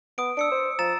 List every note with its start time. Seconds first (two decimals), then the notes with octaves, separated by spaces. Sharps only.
0.18 B3 D#6 D7
0.37 D4 E6 C#7 D7
0.52 C5
0.79 F3 A#5 A6 E7